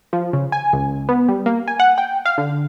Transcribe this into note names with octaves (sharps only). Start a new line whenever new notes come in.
F3
C#3
G#5
C#2
B3
G3
A#3
G#5
F#5
G5
F5
D3